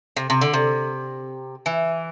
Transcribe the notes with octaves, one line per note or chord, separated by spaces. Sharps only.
C3
C3
D3
C3
E3